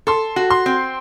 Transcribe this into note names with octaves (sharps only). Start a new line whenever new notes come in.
A4 C6
F#4
C6
C4